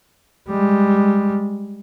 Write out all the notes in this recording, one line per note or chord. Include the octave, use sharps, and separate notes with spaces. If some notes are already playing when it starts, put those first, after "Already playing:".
G3 G#3